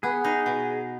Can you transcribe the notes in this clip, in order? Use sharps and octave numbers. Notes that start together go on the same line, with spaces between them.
B3 G#4
D#4
B2